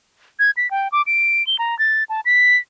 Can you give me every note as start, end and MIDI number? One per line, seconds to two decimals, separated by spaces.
0.39 0.51 92
0.57 0.69 95
0.71 0.88 79
0.92 1.02 86
1.06 1.45 98
1.47 1.56 103
1.59 1.77 82
1.79 2.04 93
2.09 2.21 81
2.25 2.57 95